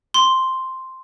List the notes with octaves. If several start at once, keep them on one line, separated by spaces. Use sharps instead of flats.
C6